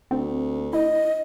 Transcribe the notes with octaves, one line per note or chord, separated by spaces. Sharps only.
D2 C4
E4 D#5